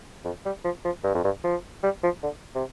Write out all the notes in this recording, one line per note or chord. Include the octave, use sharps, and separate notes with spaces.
F2
G3
F3
F3
G2
F2
G2
F3
G3
F3
D3
C3